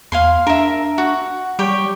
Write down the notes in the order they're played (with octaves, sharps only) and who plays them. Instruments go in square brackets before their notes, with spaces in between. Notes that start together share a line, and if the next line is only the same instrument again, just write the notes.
[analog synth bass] E2 [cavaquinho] F5 G#5 C6
[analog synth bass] D4 [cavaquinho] A#4 E5
[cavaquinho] F#4
[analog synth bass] G3 [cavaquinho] G4 C#5 G5